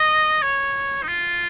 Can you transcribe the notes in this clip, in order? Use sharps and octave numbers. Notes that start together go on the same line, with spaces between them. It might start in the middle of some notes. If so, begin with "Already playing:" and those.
Already playing: D#5
C#5
D#4
F4